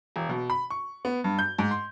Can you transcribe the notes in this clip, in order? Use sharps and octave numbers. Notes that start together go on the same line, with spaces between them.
E1
B2
B5
C#6
B3
G2
G6
G#2
C6